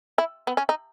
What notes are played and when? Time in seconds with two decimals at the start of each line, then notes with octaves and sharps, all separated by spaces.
0.18 E4
0.47 B3
0.57 C#4
0.69 D#4